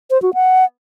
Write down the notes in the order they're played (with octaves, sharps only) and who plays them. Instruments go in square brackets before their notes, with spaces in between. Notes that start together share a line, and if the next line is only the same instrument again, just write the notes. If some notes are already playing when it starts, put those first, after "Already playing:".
[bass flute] C5
F#4
F#5